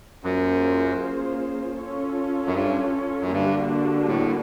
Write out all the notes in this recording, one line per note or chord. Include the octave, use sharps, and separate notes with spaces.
F#2 A#3 C#4 F4 G#4 C5
C#4 F4 A4 C#5
F#2
G2
F#2
G2 D3 G3 A#3 D4 F#4
A2